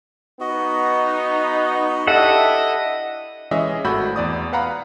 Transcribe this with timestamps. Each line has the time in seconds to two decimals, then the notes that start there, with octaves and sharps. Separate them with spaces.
0.40 B3 D#4 F#4 D#5
2.07 D4 E4 G4 A4 D#5 E5 F#5
3.51 E3 G#3 C#4 G#4 D#5 E5
3.84 G#1 A3 F#4 B5 E6 G6
4.16 E2 D5 D#6
4.52 B4 F5 F#5 A#5 B5